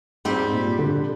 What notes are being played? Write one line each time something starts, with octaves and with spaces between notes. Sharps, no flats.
G#2 G3 C4 G4
A#2
D3